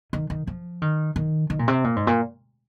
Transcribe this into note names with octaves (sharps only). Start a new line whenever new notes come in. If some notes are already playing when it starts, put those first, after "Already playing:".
D#3
D#3
F3
D#3
D#3
D#3
A#2
C3
A#2
G#2
A#2